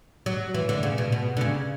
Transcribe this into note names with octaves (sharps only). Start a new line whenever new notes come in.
F#3
E3
D3
C#3
B2
B2
D3
C#3